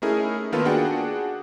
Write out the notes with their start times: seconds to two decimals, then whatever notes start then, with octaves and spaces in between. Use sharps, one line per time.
0.02 A3 C#4 D#4 E4 G#4 A#4
0.52 D#3 A#3 B3 F4 A4 B4
0.65 D4 F#4 G#4 F#5 G5